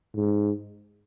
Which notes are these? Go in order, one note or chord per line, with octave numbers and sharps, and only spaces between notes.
G#2